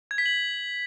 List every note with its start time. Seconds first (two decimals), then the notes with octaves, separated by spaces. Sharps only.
0.11 G#6
0.18 B6
0.26 F#7